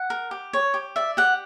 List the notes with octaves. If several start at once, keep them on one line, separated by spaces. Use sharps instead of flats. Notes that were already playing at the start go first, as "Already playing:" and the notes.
Already playing: F#5
A#4
G4
C#5
G4
D5 E5
G4 F#5